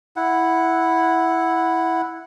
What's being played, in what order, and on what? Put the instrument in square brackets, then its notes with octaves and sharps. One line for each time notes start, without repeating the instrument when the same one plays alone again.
[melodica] E4 F#5